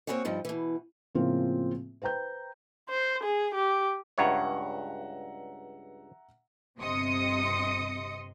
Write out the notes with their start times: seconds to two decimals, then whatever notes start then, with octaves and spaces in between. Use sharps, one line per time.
0.07 A#3 C4 D#4 F#4 G#4 C#5
0.25 G2 F3 D#4
0.45 B2 E3
1.15 A2 C#3 F3 A#3 C4 F4
2.02 B4 C5 G5 A#5 G6
2.89 C5
3.23 G#4
3.54 G4
4.18 C#2 G2 C#5 E5 F#5 A#5
6.79 G1 C3 D#5 C6 D#6 C#7